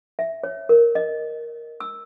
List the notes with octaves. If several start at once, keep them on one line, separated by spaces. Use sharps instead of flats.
E5
C#5
A#4
D#5
E6